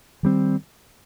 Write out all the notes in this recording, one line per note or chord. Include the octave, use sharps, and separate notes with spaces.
D#3 G3 C4